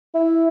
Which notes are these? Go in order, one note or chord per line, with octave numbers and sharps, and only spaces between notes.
E4